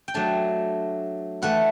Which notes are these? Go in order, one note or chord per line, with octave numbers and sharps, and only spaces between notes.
G5
F#3 A3 D4 A5
E3 A3 E4 F#5